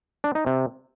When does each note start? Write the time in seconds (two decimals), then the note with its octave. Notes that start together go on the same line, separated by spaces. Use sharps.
0.24 D4
0.35 D#4
0.46 C3